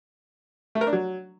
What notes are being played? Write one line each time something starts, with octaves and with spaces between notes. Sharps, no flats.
A3
A#4
D4
F#3